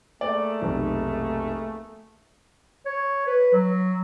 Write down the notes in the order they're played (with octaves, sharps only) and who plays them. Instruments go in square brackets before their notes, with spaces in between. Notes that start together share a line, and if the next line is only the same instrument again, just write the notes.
[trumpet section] A3 A#3 G#4 [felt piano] D5
[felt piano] F1 B1
[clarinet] C#5
B4
F#3